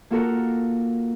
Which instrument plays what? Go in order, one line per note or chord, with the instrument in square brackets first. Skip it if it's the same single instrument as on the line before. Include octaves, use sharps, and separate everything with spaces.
[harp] A#3 F4 F#4 A4 A#4